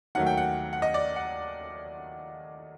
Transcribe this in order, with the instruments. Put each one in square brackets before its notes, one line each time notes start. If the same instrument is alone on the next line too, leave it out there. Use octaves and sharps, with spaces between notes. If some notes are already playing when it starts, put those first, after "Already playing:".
[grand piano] D#2 D#3 F#3 A3 F#5
G5
F#5
F#5
D#5
D5
F#5